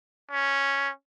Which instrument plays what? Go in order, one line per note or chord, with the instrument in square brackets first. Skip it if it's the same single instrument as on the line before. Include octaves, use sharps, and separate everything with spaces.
[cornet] C#4